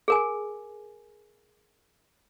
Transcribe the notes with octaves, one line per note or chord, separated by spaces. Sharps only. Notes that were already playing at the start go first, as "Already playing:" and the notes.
G#4 A#4 G#5